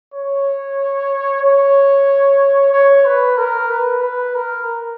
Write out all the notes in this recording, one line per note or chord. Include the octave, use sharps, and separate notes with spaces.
C#5
C#5
C#5
B4
A#4
B4
B4
A#4